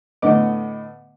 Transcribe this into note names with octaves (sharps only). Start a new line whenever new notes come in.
A2 D3 B3 D#5 D6